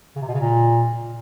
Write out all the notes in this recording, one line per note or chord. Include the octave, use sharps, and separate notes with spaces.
C#3
C3
B2
C#3
A#2